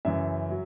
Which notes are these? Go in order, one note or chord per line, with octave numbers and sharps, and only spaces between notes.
F#2 C#3 E3 E5
F#3